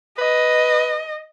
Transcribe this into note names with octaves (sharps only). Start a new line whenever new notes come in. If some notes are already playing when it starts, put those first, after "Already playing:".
B4 D#5